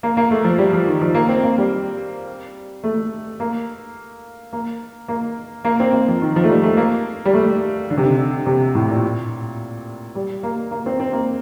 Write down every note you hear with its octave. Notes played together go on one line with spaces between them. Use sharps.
A#3
A#3
A3
F3
G3
F3
D#3
F3
A#3
C4
A#3
G3
A3
A#3
A#3
A#3
A#3
C4
A#3
F3
D#3
F3
A3
G3
A3
A#3
G3
A3
D3
C3
D3
C3
A2
A#2
G3
A#3
A#3
C4
C4
A#3